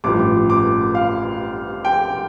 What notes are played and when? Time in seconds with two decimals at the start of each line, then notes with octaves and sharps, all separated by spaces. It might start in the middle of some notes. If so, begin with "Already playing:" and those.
0.04 A1 G2 F3 D6
0.50 D6
0.95 F5
1.85 G5